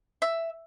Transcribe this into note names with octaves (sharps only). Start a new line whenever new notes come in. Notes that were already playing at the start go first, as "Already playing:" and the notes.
E5